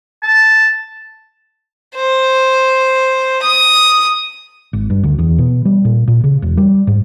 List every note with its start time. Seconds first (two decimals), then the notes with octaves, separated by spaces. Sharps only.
0.23 A5
1.95 C5
3.42 D#6
4.73 G#1
4.90 G2
5.03 D2
5.19 E2
5.38 B2
5.65 G3
5.85 A#2
6.08 A#2
6.24 C#3
6.42 E1
6.57 G3
6.87 G#2